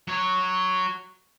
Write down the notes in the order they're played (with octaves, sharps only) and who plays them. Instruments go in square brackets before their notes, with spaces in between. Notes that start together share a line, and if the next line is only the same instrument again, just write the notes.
[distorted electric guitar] F#3 C#5